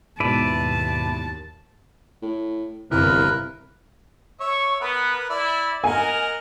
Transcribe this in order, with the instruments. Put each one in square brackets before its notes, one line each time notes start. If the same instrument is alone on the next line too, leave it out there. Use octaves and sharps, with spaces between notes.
[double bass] D#2 [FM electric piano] G#2 B2 [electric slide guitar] E4 B4 D5 [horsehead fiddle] A5
[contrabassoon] A2
[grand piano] G1 C3 [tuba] C2 [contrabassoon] E3 [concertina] A#4 B4
[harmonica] C#5 E5 [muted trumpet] C#6
[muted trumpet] B3 [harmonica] A#4 B4
[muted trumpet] E4 [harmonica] D5 E5
[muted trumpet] A#4 [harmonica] D#5 F#5 [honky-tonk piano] G#5